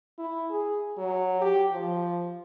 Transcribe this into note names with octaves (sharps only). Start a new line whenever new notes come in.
E4
G#4
F#3
G4
F3